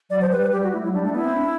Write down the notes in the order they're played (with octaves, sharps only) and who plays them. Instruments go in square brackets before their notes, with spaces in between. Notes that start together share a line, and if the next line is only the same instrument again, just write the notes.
[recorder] F#3 [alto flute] D5
[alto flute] C5
[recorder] G3 [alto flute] B4
[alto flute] B4
[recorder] G3 [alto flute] G4
[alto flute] F#4
[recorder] A3 [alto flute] E4
[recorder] F#3 [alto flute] E4
[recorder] G3 [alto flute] D4
[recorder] A3 [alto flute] D4
[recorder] B3 [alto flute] E4
[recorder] C4
D4